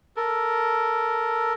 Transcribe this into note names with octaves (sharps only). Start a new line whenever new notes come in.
A4 A#4